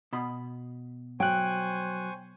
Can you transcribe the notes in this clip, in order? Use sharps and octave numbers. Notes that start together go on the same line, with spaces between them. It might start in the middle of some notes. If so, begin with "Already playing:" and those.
B2 B5
F#3 C5 G5 G#5 C#6 F#6